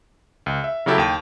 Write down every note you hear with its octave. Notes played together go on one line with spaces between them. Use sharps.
C#2
E5
C#3 F#3 E4 G4 A4
D#2 G5